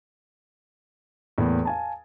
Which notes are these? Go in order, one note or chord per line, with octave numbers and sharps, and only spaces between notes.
E2 A2 A#3
F5 G#5 A5